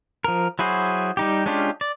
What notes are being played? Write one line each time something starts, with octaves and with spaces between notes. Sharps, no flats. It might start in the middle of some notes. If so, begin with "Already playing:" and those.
F3 A#4
F#3 E4 F#4 G#4 C5
G3 D#4 G4
G#3 C#4 D4 F4 G4
D5